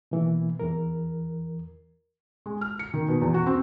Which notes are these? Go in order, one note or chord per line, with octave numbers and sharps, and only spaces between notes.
B2 E3 A#3
E2 E3 A#4
G#3
F6
C#7
D#3
B2
E2
F#4
C4